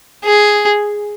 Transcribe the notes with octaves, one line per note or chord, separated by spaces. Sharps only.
G#4